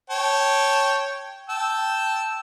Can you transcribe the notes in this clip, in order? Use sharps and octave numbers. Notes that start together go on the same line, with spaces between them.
C#5 G5 A5
G5 A5 E6